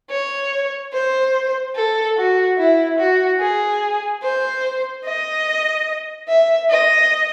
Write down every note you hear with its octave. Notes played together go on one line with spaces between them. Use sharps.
C#5
C5
A4
F#4
E4
F#4
G#4
C5
D#5
E5
D#5